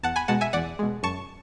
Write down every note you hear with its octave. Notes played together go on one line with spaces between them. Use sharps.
E2 F#5 A5
G#5 B5
B2 G#3 F#5 A5
E5 G#5
E2 D5 F#5
B2 G#3
F#2 A5 C#6